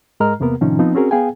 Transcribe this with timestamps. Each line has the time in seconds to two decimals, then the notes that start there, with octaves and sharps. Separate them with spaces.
0.20 G#2 G#3 A#4 D#5 A#5 F6
0.40 E2 C3 A#3 B3 A#4
0.61 A2 C3 D#3 F3 C#4 D#4
0.79 F3 B3 C4 D#4
0.95 C4 C#4 F#4 G#4 A#4
1.11 B3 G#4 F5 G5 G#5